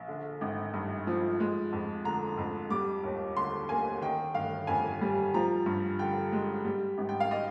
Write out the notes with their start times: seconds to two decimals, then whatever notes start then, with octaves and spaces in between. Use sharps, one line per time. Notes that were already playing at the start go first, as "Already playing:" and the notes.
Already playing: A#1
0.08 D3
0.41 G#1
0.74 G2
1.07 F3
1.40 G#3
1.73 F2
2.05 D3 A#5
2.37 F2
2.70 G3 D6
3.04 D#2
3.36 D3 C6
3.69 A#3 G#5
4.02 D#3 G5
4.35 G1 F5
4.67 F2 G#5
5.01 G3
5.34 F3 A#5
5.66 G2
5.99 D3 G5
6.32 G#3
6.65 G3
6.98 G#1
7.09 G5
7.20 F5
7.31 D#5